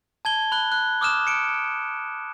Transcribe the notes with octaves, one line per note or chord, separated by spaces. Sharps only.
A5 G#6 G7
B5 F#6 G7
F#6
D6 D#6 F6 F#6 E7
C#7 D7